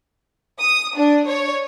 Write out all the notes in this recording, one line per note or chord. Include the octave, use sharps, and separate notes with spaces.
D#6
D4
C#5